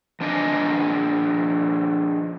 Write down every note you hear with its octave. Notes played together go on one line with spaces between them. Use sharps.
F3 D4 D5 D#5 G#5